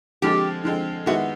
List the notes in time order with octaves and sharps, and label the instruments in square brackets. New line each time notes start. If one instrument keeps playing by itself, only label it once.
[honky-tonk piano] D3 F3 G#3 C4 [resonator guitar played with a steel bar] G4
[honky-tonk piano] D3 F3 G#3 C4
[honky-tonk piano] D#3 G#3 B3 E4 [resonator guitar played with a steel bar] F#4